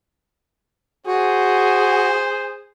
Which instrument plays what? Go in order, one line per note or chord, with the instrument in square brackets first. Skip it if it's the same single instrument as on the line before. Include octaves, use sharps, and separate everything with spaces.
[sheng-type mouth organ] F#4 [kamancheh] G#4 [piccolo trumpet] C5